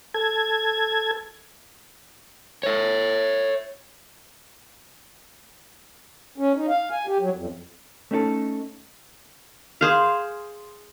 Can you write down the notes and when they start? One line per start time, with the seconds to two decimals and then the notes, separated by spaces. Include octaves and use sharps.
0.14 A4 G#6
2.63 C#5 E5
6.38 C#4
6.56 D#4
6.69 F5
6.91 G#5
7.07 G4
7.20 F#3
7.35 F2
8.11 A3 C#4 D#4 G#4 A4
9.81 G#4 C5 F5